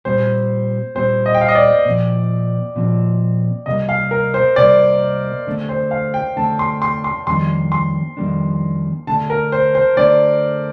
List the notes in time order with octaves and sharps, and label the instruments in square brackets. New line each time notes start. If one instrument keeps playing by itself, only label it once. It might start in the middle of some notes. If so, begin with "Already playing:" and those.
[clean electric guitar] A#2 G3 C4 [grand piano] C5
[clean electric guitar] A#2 G3 C4 [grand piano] C5
[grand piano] D#5
G5
F5
D#5
D5
[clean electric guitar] A#2 F3 C4
A#2 F3 C4
[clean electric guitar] C2 C3 G3 A#3 [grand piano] D#5
[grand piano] F5
A#4
C5
[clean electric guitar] C2 C3 G3 A#3 [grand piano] D5
[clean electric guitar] D3 A3 C4
[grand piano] C5
F5
G5
[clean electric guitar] D3 A3 C4 [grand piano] A5
[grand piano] C6
C6
C6
[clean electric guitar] F2 D#3 G3 A#3 D4 [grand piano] C6
[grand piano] C6
[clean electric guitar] F2 D#3 G3 A#3 D4
[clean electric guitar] D3 A3 D4 [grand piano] A5
[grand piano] A#4
C5
C5
[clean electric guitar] D3 A3 D4 [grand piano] D5